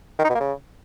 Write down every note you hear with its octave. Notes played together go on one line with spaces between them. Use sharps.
D#3
D#4
B2
A#3
C#3